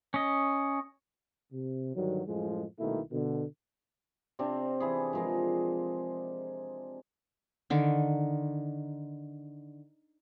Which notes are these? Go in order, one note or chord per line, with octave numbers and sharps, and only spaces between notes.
C#4 D#5
C3
G2 D3 D#3 F#3
F#2 A2 F3 G#3
C2 B2 D#3 A3 A#3 E4
B2 D3
C3 C4 D4
E3 E4 G#4
F3 G#3 A#4
D3 D#3